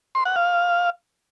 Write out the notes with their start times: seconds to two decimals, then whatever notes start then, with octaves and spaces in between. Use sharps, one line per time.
0.15 C6
0.25 F#5
0.36 F5